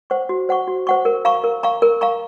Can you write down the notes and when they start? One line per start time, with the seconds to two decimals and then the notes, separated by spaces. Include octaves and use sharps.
0.10 C5 F#5 C#6
0.29 F#4
0.49 C5 F#5 C#6
0.68 F#4
0.87 C5 F#5 C#6
1.05 A#4
1.25 F5 A#5 C#6
1.44 A#4
1.63 F5 A#5 C#6
1.82 A#4
2.01 F5 A#5 C#6